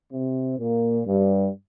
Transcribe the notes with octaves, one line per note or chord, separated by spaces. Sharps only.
C3 C4
A#2 A#3
G2 G3